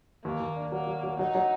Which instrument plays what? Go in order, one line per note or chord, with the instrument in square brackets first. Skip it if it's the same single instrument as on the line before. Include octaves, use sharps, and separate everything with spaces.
[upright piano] D#2 [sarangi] A#3
[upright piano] D#2
D4
[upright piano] F#3 [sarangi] A#3
[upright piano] F#3
F#3
[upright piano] F#3 [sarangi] D#4
[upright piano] F#3